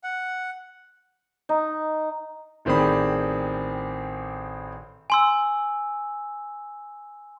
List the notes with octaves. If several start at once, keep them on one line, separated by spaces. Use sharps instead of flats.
F#5
D#4
A1 D#3 C4 G#4 D5 B5
G#5 C6 E6